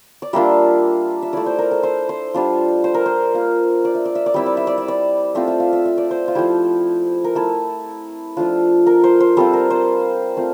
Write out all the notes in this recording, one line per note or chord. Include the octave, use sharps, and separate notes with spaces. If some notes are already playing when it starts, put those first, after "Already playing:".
D5
G3 A#3 D4 F4 E5
E5
A3 E4 D5
C5
A#4
A4
C5
C5
G3 D4 F4
C5
A#4
C5
A#3 F4
D5
E5
D5
E5
D5
G3 C4 E4 E5
D5
E5
D5
E5
D5
A3 C4 F4 E5
E5
F5
E5
E5
D5
C5
F4
F3 A3 E4 G4
A#4
A3 E4 A4
F3 A3 D4 F4
A#4
C5
C5
G3 C4 F4 A4
A#4
C5
A3 C4 F4